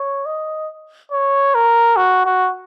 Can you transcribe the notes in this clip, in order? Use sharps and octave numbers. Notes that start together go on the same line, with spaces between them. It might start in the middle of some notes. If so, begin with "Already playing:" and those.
Already playing: C#5
D#5
C#5
A#4
F#4
F#4